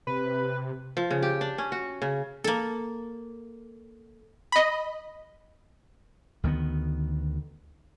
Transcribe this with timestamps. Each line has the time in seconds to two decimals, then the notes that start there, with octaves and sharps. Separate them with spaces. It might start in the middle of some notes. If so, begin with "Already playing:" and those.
0.07 C3 B4
0.97 F3
1.11 C#3
1.23 G4
1.41 D4
1.58 C#4
1.72 F#4
2.02 C#3
2.44 A#3 A4
4.52 D#5 B5
6.43 D2 D#3 F#3 B3